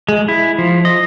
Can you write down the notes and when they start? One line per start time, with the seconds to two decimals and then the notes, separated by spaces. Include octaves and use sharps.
0.09 G#3
0.28 E4
0.58 F3
0.85 D#5